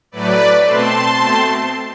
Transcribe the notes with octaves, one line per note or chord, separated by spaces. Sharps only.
A2 F#3 A3 B4 D5
B2 A3 C4 A5 C6
B2 A3 C4